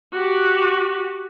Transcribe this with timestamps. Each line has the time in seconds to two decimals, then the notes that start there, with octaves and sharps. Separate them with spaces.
0.13 F#4 G4